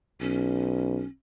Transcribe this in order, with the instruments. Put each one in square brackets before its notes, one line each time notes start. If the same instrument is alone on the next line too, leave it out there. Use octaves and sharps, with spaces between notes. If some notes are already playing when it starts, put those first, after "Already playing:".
[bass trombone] B1 [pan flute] C#4